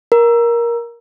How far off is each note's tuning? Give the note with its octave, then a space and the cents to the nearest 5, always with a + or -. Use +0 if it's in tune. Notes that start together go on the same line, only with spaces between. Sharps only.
A#4 +15